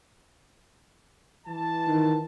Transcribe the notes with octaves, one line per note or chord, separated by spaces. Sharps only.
E3 A5
D#3